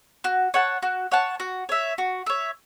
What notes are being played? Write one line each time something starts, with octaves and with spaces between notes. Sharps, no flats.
F#4
C#5 F#5 A5
F#4
C#5 F#5 A5
F#4
C#5 E5
F#4
C#5 E5